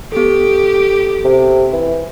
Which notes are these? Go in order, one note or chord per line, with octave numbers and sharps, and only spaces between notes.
B3 G4 A4
C3
E3